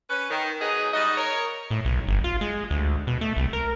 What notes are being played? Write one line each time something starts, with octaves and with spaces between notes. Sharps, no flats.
C#4 B4
D#3
F#3 B3 D#4 G#4
G3 D#4 F#4 D#5
A#4 C#5
A2
B1
G1
F4
G#3
D2
B2
A3
C2
A#4